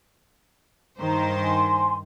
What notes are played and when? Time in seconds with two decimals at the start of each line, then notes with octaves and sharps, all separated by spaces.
0.99 G2 D#3 C5 A#5
1.43 G#5 C6